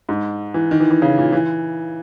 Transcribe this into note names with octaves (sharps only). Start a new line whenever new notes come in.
G#2
E3
D#3
E3
E3
C#3
A#2
E3